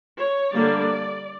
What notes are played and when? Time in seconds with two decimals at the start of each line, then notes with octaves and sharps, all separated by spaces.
0.18 C#5
0.53 D3 G3 A#3 D4 D5